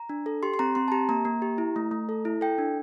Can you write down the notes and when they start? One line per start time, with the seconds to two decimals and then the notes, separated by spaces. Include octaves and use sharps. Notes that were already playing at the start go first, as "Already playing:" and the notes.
Already playing: A#5
0.09 D4
0.26 A4
0.43 G4 C6
0.54 C6
0.59 C4 A#5
0.75 C4 C6
0.88 A5
0.92 G4 A#5
1.09 A#3 A#5
1.25 A#3
1.42 G4
1.58 E4
1.76 A3
1.91 A3
2.09 A4
2.25 E4
2.41 A4 G5
2.58 D4